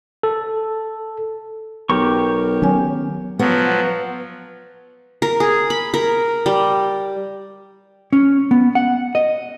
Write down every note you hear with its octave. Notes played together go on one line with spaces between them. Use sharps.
A4
B1 G4 A#4 C#6
D#3 F#3 B3 C#4 G#5
F3 F#3 B3
A#4
G#4
B5
A#4
G3
C#4
B3
F#5
D#5